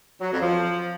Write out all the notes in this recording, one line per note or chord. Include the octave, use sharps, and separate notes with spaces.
F#3
F2
F3